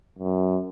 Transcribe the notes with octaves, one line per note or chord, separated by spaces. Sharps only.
F#2